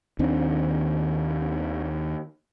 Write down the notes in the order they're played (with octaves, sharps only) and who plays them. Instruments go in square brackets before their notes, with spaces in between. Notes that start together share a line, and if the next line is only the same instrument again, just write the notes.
[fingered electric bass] D#2 D#3 C4 D4